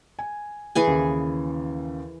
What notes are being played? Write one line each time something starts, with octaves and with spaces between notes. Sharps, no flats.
G#5
E3 G#4 G#5
D#2 C#3